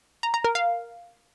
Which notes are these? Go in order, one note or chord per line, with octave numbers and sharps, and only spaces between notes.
A#5
A#5
A#4
F5